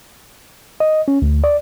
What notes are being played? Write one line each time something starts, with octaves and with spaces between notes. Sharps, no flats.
D#5
C#4
D2
D5